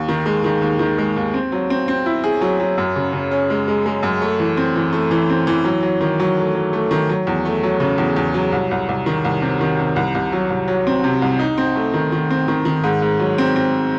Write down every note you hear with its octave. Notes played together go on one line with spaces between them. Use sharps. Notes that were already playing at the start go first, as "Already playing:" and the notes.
Already playing: D#2
D#3
G#3
D#3
D#2
D#3
G#3
D#2
C4
F#3
C4
C4
E4
G#4
F#3
F#3
F#2
C#3
C#3
C#4
G#3
G#3
G#3
F#2
A3
E3
C4
E3
A3
E3
C4
E3
F#3
F#3
D#3
F#3
A3
F#3
A3
D#3
F#3
E2
A3
F#3
C#3
E2
E2
F#3
C2
C2
C2
D#3
C2
C3
D#3
C3
C2
C2
F#3
C2
F#3
C4
C3
C2
D#4
C4
A3
D#3
D#3
C4
D#3
D#3
G#2
G#2
F#3
C4
C4